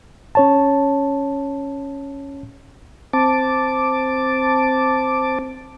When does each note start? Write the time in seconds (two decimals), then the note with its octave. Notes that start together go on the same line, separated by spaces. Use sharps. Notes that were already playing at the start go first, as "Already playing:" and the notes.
0.35 C#4 C#5 A5
3.13 C4 A5 D6